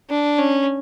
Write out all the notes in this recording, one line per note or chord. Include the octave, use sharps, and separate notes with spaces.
D4
C#4